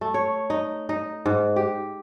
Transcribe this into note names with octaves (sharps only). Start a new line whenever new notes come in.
A3
C#5
D#4
D#4
G#2
G4